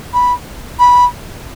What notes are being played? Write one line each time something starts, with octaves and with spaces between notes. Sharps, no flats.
B5
B5